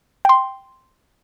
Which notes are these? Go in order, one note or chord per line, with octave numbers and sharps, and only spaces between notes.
G5 C6